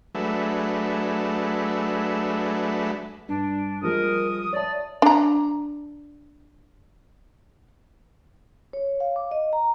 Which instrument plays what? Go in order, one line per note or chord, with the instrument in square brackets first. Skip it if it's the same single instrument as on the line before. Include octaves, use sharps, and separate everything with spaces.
[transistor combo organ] F#3 G#3 A3 D4 B4 E5
[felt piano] G2 [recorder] D4
[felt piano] F3 G3 G#3 [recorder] A#4 [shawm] D#6
[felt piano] C#5 E5 A5 [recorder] D5
[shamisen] D4 A#5
[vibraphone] C#5
F5
D6
D#5
A#5